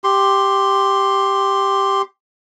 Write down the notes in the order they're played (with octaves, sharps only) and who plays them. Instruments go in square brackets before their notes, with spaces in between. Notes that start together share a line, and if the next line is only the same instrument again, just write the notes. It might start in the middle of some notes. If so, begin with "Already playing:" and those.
[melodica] G4 C6